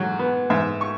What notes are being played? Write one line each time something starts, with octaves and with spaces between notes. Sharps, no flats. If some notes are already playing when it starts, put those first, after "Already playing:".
Already playing: G#2 F#3
B3
G#2 E5
C#6